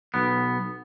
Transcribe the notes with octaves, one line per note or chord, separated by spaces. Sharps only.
B1 B3